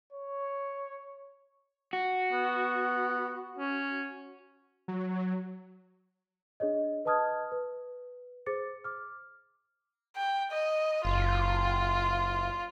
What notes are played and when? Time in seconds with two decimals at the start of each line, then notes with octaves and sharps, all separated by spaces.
0.12 C#5
1.93 F#4
2.33 B3
3.58 C#4
4.88 F#3
6.60 D4 G#4 C#5 D#5
7.05 B4 D#5 A5 D#6 F6 G#6
7.52 B4
8.46 G#4 C5 D6 A6 C#7
8.84 D6 F6
10.16 G5
10.52 D#5
11.05 F#1 F4